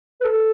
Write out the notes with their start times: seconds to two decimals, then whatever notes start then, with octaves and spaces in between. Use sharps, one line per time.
0.20 B4
0.25 A4